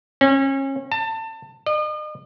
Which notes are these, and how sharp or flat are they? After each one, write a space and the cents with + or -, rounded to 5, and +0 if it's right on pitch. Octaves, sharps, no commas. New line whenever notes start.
C#4 -30
A5 +25
D#5 -40